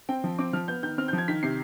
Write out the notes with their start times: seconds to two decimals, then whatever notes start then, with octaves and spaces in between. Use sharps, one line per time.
0.09 C4 G5
0.24 F3
0.39 C4 D6
0.53 F3 F6
0.68 B3 G6
0.83 D#3 G6
0.98 C4 F6
1.08 G6
1.13 F3
1.18 G#6
1.28 D#3 B6
1.43 C3 C7